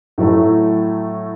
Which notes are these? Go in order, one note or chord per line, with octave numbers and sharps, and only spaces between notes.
A2 F#3 A3